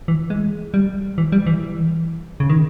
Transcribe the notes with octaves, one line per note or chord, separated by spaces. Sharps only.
E3
G#3
G3
E3
G3
E3
C#3
D#3